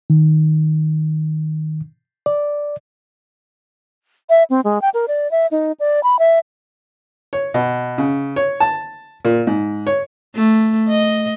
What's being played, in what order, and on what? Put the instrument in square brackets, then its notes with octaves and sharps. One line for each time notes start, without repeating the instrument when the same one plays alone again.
[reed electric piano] D#3
D5
[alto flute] E5
C4
G#3
G5
A#4
D5
E5
D#4
D5
B5
E5
[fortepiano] C#5
B2
C#3
C#5
A5
A#2
G#2
C#5
[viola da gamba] A3
D#5